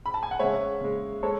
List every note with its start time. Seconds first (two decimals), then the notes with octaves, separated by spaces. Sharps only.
0.06 B5
0.14 A5
0.23 G#5
0.31 F#5
0.39 C#3 G#3 C#5 E5
0.81 C#3 G#3
1.23 G#3 A4 C#5